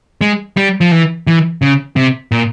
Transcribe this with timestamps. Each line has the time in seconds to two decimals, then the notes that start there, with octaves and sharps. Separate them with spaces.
0.21 G#3
0.57 G3
0.81 F3
0.91 E3
1.27 E3
1.62 C#3
1.96 C3
2.32 A#2